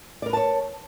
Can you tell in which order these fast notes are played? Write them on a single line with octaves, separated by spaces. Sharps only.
D5 A#4 B4 A5 C#5